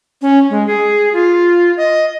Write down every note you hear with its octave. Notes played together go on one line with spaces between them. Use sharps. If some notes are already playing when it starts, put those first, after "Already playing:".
C#4
G#3
G#4
F4
D#5